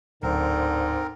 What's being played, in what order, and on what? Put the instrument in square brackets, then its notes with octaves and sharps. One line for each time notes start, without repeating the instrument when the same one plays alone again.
[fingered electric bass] D1 [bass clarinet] G#2 [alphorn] D3 [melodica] C4 A#4